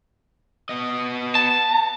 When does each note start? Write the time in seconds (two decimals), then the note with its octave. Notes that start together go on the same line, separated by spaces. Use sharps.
0.69 B3 D#5
1.35 A5